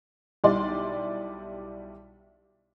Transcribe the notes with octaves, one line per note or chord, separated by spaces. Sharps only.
B1 G3 E4 D5 C6